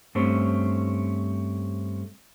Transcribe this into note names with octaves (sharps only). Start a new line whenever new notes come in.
G2 A3 C4 C#4